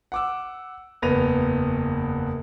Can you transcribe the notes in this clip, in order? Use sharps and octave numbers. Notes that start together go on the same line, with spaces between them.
F#5 D6 E6
F#1 E2 B4 A#6 D#7 F7